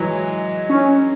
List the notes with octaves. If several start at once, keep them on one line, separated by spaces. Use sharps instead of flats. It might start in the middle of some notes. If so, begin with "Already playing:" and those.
Already playing: E3 F#3 G#3
C#4